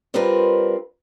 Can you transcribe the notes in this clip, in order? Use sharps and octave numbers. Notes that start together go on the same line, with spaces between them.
G3 C4 D4 F4 A#4 B4